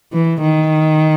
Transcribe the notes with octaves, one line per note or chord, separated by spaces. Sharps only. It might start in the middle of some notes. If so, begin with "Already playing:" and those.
E3
D#3